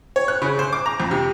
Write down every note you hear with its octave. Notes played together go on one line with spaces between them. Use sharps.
C#5
F#6
C#3
C5
D6
A#5
F2
C3